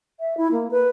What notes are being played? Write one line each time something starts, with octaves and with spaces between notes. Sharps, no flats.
E5
E4
A#3
B4